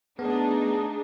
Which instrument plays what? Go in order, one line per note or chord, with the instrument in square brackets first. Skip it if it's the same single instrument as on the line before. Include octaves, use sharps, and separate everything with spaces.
[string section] A3 D4 D#4 [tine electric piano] B3 [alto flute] G#4